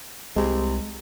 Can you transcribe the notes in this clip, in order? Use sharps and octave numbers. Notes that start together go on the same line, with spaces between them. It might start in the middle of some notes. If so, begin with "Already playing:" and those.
C2 C3 G#3